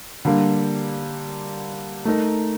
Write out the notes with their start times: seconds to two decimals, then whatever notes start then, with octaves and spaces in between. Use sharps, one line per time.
0.25 D3 G3 A#3
2.05 A3 D#4 A#4